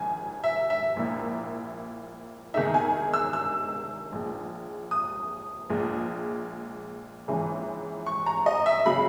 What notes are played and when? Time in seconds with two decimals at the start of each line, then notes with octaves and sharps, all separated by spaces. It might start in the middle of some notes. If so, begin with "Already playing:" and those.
Already playing: A#1 G#2 D#3 G#5
0.44 E5
0.70 E5
0.96 A#1 A#2 A#3 E4
2.54 E2 D#3 G#3 D#4 E5
2.74 G#5
3.14 E6
3.33 E6
4.12 A#1 A#2 G#3
4.91 D#6
5.70 A#1 A#2 G#3
7.28 A#1 G#2 E3 G#3 C#4
8.06 C#6
8.26 A#5
8.46 D#5
8.66 E5
8.86 C#3 F#3 B5